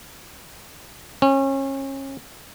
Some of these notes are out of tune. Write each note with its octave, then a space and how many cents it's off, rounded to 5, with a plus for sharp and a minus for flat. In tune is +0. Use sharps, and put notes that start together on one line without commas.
C#4 -30